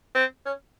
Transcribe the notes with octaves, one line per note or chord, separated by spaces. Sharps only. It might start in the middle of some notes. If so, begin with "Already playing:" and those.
C4
C#4